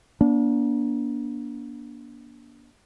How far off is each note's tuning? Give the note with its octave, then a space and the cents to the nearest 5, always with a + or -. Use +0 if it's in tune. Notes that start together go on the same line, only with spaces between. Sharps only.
A#3 +40 D4 -25